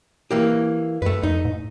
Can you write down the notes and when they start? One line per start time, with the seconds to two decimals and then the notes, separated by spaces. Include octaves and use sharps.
0.31 E3 A#3 G4
1.02 F#2 A3 B4
1.23 F2 D#4
1.45 A2